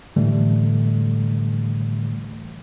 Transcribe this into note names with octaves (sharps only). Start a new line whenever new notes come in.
A2 D3 E3 G3 A3